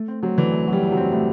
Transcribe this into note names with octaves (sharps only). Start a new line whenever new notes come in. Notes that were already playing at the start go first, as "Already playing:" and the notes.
Already playing: A3
C4
F#3 C4
D3 E3
E2
F#3
G3
E2
F#3 C4
A2